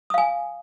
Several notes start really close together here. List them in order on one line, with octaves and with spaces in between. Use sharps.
D#6 F5 G#5